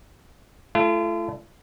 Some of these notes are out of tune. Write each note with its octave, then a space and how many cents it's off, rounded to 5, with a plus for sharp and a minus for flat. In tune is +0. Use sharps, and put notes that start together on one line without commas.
A3 -15 F4 -45